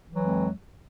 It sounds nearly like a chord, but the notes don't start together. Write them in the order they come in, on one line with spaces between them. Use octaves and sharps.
E3 F#3 F2 G#3